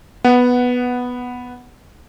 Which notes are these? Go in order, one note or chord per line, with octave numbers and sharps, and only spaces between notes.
B3 F#5